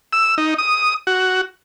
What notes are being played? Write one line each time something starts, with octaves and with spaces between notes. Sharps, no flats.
E6
D#4
D#6
F#4